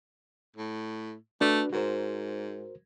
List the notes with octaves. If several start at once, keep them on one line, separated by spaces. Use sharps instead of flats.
A2
A3 D4 F#4 B4
G#2 F#4 A#4 C5